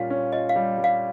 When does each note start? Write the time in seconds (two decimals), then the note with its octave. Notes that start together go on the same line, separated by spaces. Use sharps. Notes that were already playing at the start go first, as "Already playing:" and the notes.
Already playing: A#2 G3 C#4 F4 F5
0.10 C#4
0.32 F4 D#5
0.49 F5
0.56 G3
0.78 G3
0.84 F5